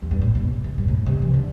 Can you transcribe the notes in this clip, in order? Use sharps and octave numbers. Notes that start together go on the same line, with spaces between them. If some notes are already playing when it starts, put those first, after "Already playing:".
E2
G2
A2
B2
C3
G2
A2
C3
E3
D3